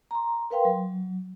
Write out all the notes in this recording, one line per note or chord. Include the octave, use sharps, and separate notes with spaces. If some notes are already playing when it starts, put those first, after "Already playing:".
A#5 C6
A#4 B4 F5 G5 C6
F#3